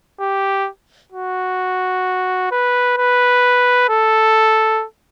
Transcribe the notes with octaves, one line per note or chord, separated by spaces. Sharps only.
G4
F#4
B4
B4
A4